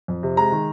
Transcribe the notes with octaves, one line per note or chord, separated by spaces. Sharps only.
F2
C3
G#3 A#5
D#3